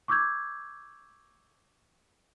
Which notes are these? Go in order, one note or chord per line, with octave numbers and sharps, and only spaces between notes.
C#6 D6 E6 G6 G#6